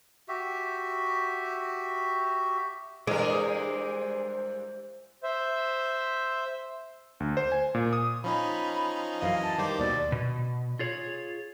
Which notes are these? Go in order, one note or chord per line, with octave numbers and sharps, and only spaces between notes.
F#4 G4 E5
G2 E3 G#3 G#4 A#4 C5 D5
C5 E5
D2
C5
G#5
A#2
D#6
F3 C#4 D#4 B5
F#2 E3 D#5 F5
A5
D#3 G3 C5 D6
D#2 B2 D5
B2
F4 G#4 C#5